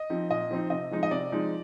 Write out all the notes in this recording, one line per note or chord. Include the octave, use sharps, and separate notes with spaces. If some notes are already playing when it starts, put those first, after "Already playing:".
Already playing: D#5
F3 C4 D#4
A#2 D#5
F3 C4 D#4
C3 D#5
F3 G#3 D#4
D#5
C3 D5
F3 G#3 D#4